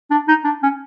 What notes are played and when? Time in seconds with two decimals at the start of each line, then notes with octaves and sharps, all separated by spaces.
0.10 D4
0.28 D#4
0.44 D4
0.63 C#4